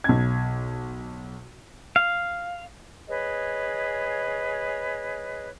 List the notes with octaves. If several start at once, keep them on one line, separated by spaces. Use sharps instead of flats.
B1 G#6
F5
G#4 B4 C#5 D#5